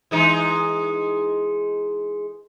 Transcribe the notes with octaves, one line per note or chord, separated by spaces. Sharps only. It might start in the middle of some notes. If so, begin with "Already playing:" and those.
E3 G#3 D#4